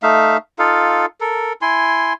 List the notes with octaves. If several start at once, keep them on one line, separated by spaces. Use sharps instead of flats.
A3 D#4 E5 F5
D#4 F4 A4 F5
A4 A#4
E4 G#5 C6